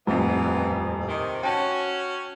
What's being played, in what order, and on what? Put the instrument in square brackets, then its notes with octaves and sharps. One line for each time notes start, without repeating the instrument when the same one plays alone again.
[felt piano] D#1 A1 F2 [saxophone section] E3 B3
[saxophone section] C3 D#3
[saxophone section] C#4 F#4 [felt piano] G5 A5